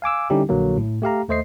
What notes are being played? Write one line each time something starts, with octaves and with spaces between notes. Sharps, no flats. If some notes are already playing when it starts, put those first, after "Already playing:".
F5 G#5 D6 E6
D3 G3 C#4 D#4 E4 G4
A#1 D3 F#3 A#3
A2
A3 G4 F5 A#5
D#2 A3 C5 D#5 C7